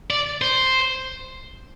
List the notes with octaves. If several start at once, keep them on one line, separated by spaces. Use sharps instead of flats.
D5
C5